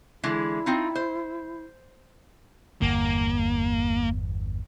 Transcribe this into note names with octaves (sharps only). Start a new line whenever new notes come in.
D3 E3 G#3 E4
C4 D#4 F4
C5
G1 E2 A#3